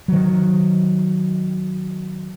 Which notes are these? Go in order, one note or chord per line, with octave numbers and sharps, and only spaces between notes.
D#3 F#3